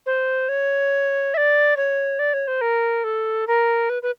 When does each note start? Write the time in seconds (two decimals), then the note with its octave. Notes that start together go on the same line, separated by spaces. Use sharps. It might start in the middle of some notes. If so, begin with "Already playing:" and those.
0.06 C5
0.49 C#5
1.34 E5
1.37 D5
1.77 C#5
2.19 D5
2.33 C#5
2.47 C5
2.61 A#4
3.04 A4
3.47 A#4
3.89 B4
4.02 B4